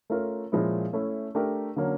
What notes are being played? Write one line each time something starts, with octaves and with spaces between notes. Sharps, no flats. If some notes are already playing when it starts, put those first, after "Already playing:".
A3 C#4 F4 A#4
A#2 F3 G#3 C#4 E4
A3 C#4 E4
A3 D4 G4 A#4
D3 F#3 A#3 C#4